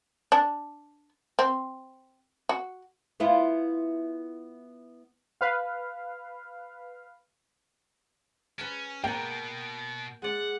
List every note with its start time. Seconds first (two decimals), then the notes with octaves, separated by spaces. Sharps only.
0.32 D4
1.39 C4
2.49 F#4
3.20 B3 E4 F4
5.41 B4 F5
8.59 C#4 B4 A5
9.04 B2 A#3 F#5 G5
10.22 G#3 D5 F#5